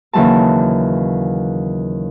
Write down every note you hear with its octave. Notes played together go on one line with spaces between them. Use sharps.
D#2 C#3 E3 F#3 A5